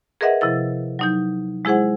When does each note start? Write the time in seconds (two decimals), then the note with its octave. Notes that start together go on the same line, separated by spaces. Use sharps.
0.21 G#4 A#4 B4 D#5 E5 F#5
0.41 C3 F3 E4 A6
0.99 F#3 D#4 G6
1.65 G#3 E4 G#4 C5 F#5